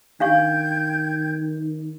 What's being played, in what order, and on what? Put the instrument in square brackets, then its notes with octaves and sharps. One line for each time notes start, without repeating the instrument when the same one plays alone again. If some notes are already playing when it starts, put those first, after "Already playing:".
[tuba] D#3 [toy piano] D4 F5 C#6 [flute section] G5 G6 G#6